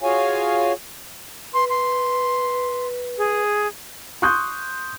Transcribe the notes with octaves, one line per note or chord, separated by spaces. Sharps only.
F4 F#4 G#4 C#5 F5 G#5
B4 C6
C6
G#4
C6 C#6 D#6 F#6 G6